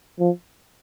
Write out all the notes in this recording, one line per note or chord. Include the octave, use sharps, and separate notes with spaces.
F3